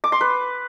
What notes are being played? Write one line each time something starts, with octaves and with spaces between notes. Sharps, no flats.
D6
C6
B4